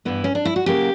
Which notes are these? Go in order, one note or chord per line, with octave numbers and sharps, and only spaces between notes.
G2 E3 B3 E4
C#4
D4
E4
F#4
C#3 F#3 A#3 G4